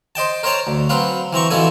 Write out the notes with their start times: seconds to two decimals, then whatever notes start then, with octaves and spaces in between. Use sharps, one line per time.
0.15 C5 D#5 G5 A5
0.43 A#4 C5 C#5 G5 A5 A#5
0.67 D2
0.89 F#3 C4 B4 F5
1.33 E3 C4 A#5 C#6
1.50 B2 E3 F3 C4 A4 G#5